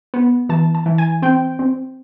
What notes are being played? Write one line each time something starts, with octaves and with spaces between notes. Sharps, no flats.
B3
E3 A5
A5
E3
G#5
C4 G5
C4